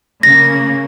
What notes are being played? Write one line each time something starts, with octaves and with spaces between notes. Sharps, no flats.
C#3 A#3 A#6